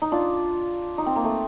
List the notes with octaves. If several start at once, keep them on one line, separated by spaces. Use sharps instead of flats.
D#4
D4 F4
D#4
C4
A#3
A3